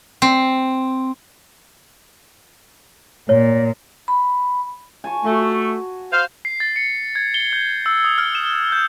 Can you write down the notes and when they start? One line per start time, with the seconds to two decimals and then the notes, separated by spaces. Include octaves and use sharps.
0.22 C4
3.29 A#2 C#5
4.08 B5
5.04 G#5 A5 C#6
5.24 A3 F#4
6.12 C5 F5
6.45 C7
6.60 A6
6.76 C#7
7.15 G#6
7.34 G7
7.53 G6
7.86 E6
8.04 D#6
8.18 F6
8.35 E7
8.72 G6